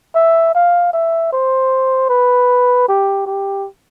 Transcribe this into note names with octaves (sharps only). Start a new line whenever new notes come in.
E5
F5
E5
C5
B4
G4
G4